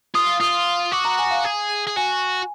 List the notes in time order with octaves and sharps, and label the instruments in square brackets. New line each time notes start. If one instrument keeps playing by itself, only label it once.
[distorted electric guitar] F4 [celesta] D#6
[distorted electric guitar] F4 [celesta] D#6
[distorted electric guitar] F#4 [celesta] D6
[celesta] A#5
G#5
F5
[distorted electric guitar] G#4
G#4
[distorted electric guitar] F#4 [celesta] G#5